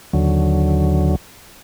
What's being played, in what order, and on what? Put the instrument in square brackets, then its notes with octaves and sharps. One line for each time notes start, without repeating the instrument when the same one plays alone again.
[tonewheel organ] D#2 D3 F#3